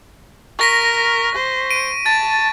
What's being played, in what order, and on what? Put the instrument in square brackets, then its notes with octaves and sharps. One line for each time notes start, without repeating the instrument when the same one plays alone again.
[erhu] A#4 [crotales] C#6 A#6 B6
[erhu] C5
[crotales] D7 D#7
[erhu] A5 [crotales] A6